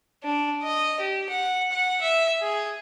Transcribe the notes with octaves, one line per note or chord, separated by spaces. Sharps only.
D4
D#5
G4
F#5
F#5
E5
G#4